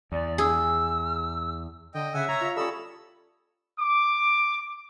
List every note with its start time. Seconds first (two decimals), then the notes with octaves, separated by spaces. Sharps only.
0.12 E2 D5
0.38 G#4 E6
1.94 D3 D#5 G5
2.14 C#3 E5 F#5 G#5 E6
2.28 C#5 A#5
2.41 F4
2.56 G3 C#4 A4 B5 C#6 D#6 E6
3.79 D6